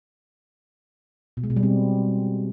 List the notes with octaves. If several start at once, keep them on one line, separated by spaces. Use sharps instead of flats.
B2
G#3
B2
G3
C4